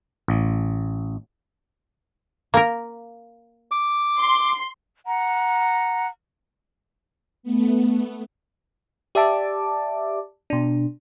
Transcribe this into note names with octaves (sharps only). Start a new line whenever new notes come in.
A1
A#3 A#4
D6
C6
F#5 A#5
A3 B3
G4 D5 E5 A5 D6
B2 D4